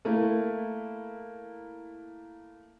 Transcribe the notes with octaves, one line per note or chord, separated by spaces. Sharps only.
A3 A#3 E4